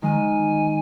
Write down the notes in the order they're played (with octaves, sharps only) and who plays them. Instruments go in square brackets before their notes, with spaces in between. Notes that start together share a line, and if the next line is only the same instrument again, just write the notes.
[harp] D#3 G#3 [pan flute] G#5